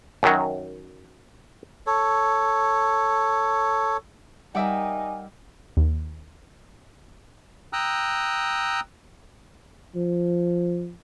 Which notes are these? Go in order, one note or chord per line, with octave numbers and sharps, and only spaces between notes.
F#2 D#3 F#3
A4 C#5
G3 D#4 A#4 E5 F#5 G#5 D6 E6
D#2
G5 A#5 D#6 E6 F#6
F3